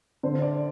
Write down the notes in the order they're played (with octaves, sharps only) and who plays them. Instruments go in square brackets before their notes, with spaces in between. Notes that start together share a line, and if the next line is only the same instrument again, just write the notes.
[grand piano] D3 C5
D5